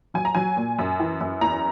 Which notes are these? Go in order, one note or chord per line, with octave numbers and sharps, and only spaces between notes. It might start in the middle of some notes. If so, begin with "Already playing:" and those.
F#3 G#5
A#5
F#3 G#5
A#2
F#2
E3
F#2
E2 A#5